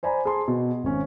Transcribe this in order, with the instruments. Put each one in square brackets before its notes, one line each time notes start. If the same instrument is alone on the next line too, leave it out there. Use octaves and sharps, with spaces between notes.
[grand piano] C5 D5 G#5 A#5 B5
G#4 A5 C6
B2
G#1 C#4